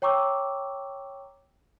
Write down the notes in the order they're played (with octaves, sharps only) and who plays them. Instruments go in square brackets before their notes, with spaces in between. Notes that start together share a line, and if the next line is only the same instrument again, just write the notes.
[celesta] C#5 G5 A#5 C#6 D6 E6